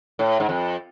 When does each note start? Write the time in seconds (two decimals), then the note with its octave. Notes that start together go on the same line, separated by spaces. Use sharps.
0.19 A2
0.40 G#2
0.49 F2